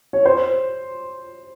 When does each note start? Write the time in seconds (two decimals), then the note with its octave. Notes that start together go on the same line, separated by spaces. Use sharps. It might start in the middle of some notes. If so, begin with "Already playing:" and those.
0.13 C#5
0.26 C5